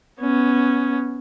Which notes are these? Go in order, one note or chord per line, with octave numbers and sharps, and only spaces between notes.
B3 C#4